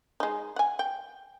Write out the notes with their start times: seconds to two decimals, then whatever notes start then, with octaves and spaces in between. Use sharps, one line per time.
0.20 G#3 D#4
0.56 F#5 G#5
0.79 G5